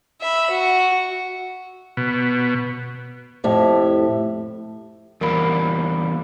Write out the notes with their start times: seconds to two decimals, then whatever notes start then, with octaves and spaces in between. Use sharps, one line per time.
0.21 E5 B5
0.50 F#4
1.97 B2
3.44 F2 A2 G4 E5
5.21 E2 G3 A#3 A#4 B5